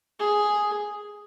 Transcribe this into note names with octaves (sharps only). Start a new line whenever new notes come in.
G#4